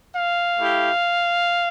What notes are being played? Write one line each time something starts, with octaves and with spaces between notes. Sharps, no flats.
F5
A3 E4 G4